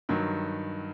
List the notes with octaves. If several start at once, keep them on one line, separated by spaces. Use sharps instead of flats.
G2 D#3 F#3